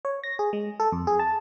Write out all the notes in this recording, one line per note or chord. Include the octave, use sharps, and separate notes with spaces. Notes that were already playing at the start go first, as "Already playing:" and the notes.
C#5
A#6
G#4
G#3
A4
F2
G#4
A5